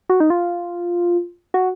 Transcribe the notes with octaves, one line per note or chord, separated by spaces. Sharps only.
F#4
D#4
F4
F#4